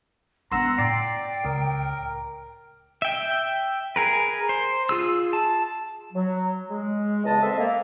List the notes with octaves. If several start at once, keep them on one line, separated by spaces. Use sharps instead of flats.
B3 D4 F#5 A#5 C6 E6
A2 D5 G5 C7
C#2 A#4
E5 G5
G#4 A#4 B4
C5
F4 G#4 E6
A5
F#3
G#3
E2 C#3 G#3 D#5 A5
C4 A4 D#5 E5
A#3